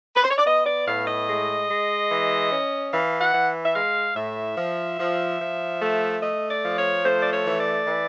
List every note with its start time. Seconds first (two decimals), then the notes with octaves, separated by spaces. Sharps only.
0.16 B4
0.23 C5
0.31 C#5
0.38 D5
0.46 B3 D#5
0.66 D5
0.86 A2 F5
1.07 D#5
1.28 G#3
1.69 G#3
2.10 E3
2.51 C#4
2.92 E3 F5
3.20 F#5
3.34 E3
3.65 E5
3.75 G#3 F5
4.16 A2 E5
4.57 F3
4.98 F3
5.40 F3
5.81 A3
6.22 A3 D#5
6.50 D5
6.63 F3
6.77 C#5
7.04 A3 C5
7.21 D5
7.32 C#5
7.45 E3
7.59 D5
7.86 E3